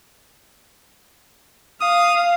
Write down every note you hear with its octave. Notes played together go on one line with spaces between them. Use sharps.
F5 D#6